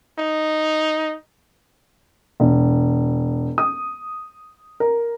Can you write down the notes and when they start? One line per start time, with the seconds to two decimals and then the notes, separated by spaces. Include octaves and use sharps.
0.19 D#4
2.40 E1
3.58 D#6
4.80 A#4